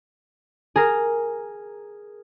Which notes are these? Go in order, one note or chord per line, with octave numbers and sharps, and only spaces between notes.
G#4 A#4